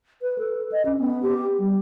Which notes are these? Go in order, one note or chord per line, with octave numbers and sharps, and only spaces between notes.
B4
A4
D#5
C#4
B3
G4
G3